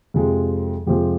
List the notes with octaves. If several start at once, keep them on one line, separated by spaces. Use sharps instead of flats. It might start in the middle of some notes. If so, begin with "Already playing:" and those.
F2 C3 F3 G#3
F2 C3 F3 G#3 G4